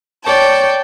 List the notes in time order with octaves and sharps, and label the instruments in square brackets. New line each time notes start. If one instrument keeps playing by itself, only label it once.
[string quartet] C#5 D5 G5 A5